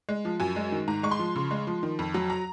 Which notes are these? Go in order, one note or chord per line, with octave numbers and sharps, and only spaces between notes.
G#3
F3
F#2 G#5
G#3
D#3
G#2 A#5
G#3 C#6
C6
F3
C#3
G#3
F3
D#3
F2
F#3
A#5